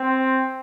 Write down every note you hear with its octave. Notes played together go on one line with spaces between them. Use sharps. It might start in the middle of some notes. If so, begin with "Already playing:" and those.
Already playing: C4